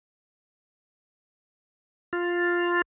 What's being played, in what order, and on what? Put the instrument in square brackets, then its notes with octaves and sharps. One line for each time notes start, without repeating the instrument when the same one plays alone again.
[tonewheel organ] F4